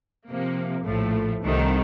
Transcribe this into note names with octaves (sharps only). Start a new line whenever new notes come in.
C3 F3 A#3
A#1 A2 F3 A3
C2 C3 D#3 A3